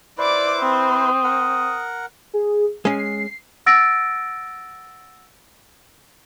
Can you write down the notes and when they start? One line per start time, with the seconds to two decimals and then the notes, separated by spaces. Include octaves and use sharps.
0.18 E4 B4 C5 D5 D6
0.61 C4 D#6
1.24 A#4 F#5
2.34 G#4
2.85 G#3 C#4 C7
3.66 F#5 E6 A6 A#6 D7